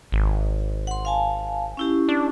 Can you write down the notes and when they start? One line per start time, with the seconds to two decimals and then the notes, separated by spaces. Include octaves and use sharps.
0.12 G#1
0.87 F#5 C6
1.05 F5 G#5 A5
1.77 C#4 E4 G4
2.09 D4